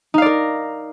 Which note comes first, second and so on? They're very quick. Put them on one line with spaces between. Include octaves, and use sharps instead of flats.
D#4 F5 D5 A#4